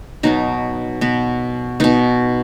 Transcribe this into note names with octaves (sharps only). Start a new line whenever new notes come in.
B2 F#3 B3 D#4
B2 B3
B2 B3 D#4